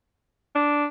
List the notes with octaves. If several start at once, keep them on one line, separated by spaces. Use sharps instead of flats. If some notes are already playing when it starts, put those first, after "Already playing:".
D4